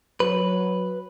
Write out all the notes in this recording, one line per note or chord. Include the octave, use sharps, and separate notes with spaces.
F#3 B4